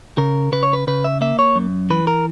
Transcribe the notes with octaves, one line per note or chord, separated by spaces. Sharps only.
C#3 A#4
C#3 B4
C#5
B4
C#3 B4
E5
A#3 E5
C#5
F#2
E3 B4
A#4